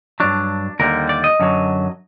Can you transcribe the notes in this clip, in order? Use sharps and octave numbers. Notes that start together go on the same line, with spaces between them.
G2 F#3 D4
D#2 D3 G3 A#4
D5
D#5
F#2 D3 F#3